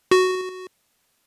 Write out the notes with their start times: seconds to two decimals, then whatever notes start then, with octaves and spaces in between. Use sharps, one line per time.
0.11 F#4